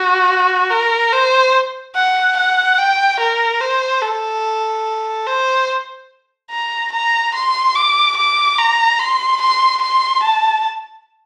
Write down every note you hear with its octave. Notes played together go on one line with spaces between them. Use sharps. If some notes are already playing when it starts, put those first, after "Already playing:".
Already playing: F#4
A#4
C5
F#5
F#5
G5
A#4
C5
A4
C5
A#5
A#5
C6
D6
D6
A#5
C6
C6
C6
A5